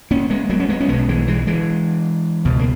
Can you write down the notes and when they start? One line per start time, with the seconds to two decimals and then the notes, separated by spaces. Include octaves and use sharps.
0.11 A#3 C#4
0.30 G#3 B3
0.50 F#3 A#3
0.60 C#4
0.69 G#3 B3
0.80 C#4
0.88 B1 B2 G#3 B3
1.09 E3 G#3
1.28 E3 G#3
1.47 E3 G#3
2.45 C#2 B2
2.59 A#3